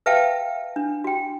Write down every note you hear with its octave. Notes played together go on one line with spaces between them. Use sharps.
B4 E5 F5 G5 A5
D4
F#4 G5